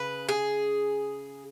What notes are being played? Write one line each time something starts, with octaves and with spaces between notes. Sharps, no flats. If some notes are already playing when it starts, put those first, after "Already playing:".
Already playing: C#3 B4
G#4